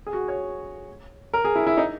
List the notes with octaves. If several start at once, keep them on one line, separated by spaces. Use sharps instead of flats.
G#4
F#4
C#5
A#4
G#4
E4
E4
D#4